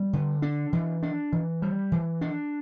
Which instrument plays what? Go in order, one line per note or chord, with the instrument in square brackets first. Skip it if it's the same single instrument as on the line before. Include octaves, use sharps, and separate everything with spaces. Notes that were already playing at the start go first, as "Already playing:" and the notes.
Already playing: [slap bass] G3
D3
D4
E3
D4
E3
G3
E3
D4